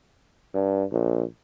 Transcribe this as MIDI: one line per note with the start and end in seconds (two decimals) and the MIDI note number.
0.54 0.84 43
0.91 1.23 34